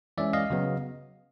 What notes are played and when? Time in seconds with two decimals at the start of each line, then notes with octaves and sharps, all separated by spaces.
0.18 E3 G#3 C#4 D5 E5
0.33 D#5 F5
0.50 C#3 F#3 B3